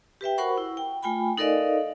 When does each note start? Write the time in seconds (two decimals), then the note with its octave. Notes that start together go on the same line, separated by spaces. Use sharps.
0.21 G4 B4 E5 G5
0.38 F#4 A#4 C5 F#5 B5 C#6
0.58 E4
0.77 G5
1.03 A3 F4 G5 G#5 B5
1.38 D#4 A4 A#4 D5 D#5 F5